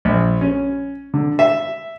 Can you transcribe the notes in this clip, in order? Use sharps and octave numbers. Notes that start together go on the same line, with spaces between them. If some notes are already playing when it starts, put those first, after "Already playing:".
A#1
C#4
D3
E5